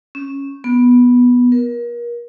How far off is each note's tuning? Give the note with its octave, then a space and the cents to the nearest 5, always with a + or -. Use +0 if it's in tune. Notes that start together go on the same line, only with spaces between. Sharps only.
C#4 -10
B3 -5
A#4 +35